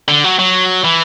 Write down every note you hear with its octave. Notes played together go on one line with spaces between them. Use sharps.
D3
F#3
F#3
E3